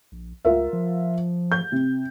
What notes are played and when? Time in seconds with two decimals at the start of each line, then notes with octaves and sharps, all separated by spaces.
0.12 A#1
0.45 C#2 F4 A#4 E5
0.73 F3
1.52 G6
1.72 C3